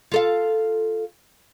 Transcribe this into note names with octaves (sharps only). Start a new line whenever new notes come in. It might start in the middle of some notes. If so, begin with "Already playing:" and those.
F4 A4 F5